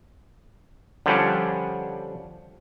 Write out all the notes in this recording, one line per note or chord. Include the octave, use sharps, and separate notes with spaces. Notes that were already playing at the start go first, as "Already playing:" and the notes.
D3 F3 G3 C#4 D4